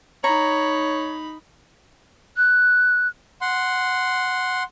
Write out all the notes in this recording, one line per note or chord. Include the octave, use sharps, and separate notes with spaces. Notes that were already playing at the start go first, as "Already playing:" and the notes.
D#4 C#5 A#5 B5
F#6
F#5 C6